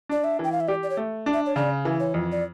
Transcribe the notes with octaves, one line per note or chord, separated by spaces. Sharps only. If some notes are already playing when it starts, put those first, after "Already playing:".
D4 D5
E5
E3 G5
F5
E5
G4 D5
D5
C#5
A3
D4
E5
C#5
C#3 D5
E3
C#5
F2
D5